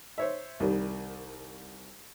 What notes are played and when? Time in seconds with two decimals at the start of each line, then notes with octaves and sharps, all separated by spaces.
0.18 C5 C#5 E5
0.60 C2 D#3 G3